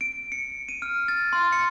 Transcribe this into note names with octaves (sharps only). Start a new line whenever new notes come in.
D7
C#7
D#7
F6
A6
C6
C#7